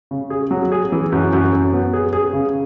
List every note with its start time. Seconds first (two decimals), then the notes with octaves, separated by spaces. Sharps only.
0.11 C#3
0.30 G#4
0.51 F#3
0.72 G#4
0.92 E3
1.12 F#2
1.33 F#2
1.53 F#2
1.73 B3
1.94 G#4
2.13 G#4
2.33 C#3